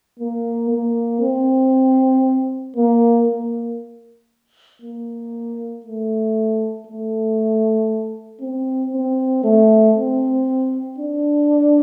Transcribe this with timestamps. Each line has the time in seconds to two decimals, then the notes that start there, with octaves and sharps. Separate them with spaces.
0.19 A#3
0.70 A#3
1.21 C4
2.76 A#3
3.28 A#3
4.82 A#3
5.84 A3
6.87 A3
8.41 C4
8.93 C4
9.44 A3
9.95 C4
10.98 D4